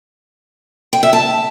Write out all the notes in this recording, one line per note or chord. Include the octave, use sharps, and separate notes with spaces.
G5
E5
A5